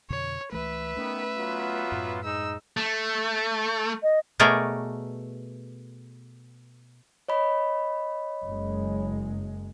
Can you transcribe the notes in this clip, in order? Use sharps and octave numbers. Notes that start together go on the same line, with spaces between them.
F2 B2 D3 C#5
C#2 E3 A3 B4 E5
D#3 A3 B3 C#4
F#3 B3 F4
F#2 A2
G#2 G#3 D#4 E6
A3
D#5
B2 A3 G#4 A#4 C#5 D5
C#5 D#5 B5
F#1 F#2 G#3